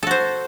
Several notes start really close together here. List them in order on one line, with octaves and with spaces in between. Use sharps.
A4 F#4 C5